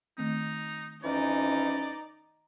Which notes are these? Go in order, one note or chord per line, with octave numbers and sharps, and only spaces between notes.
D#3 A3 C4 D#4
F2 E3 C#4 D#4 D5